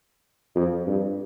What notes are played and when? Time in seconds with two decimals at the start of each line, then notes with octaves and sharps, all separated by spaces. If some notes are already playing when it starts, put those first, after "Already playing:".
0.55 F2
0.87 G2